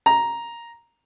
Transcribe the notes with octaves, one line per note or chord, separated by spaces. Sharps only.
A#5